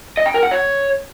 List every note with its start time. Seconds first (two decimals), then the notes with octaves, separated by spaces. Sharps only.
0.17 D#5
0.26 G5
0.34 A#4
0.43 F#5
0.51 C#5